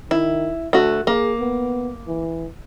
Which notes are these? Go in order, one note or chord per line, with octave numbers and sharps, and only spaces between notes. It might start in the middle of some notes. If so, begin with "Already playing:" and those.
D#3 E4
D2 A3 F#4
A#3 G#4
B3
E3